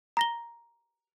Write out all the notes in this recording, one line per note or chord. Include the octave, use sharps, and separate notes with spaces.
A#5 A#6 G7